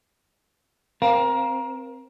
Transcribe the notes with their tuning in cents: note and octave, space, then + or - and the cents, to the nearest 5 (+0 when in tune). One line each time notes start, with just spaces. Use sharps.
C4 +0 A#4 +25 F5 +0